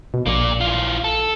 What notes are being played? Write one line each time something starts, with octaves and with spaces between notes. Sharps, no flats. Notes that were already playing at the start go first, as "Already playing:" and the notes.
B2
A#1 A#3 D5
E3 F4
A4